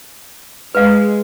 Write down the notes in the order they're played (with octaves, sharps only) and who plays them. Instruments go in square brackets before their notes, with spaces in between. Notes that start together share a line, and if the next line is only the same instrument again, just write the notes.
[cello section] G#3 [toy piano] B4 F5